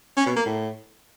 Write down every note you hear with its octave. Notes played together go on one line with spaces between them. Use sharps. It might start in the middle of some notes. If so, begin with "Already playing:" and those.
C#4
B2
A#3
A2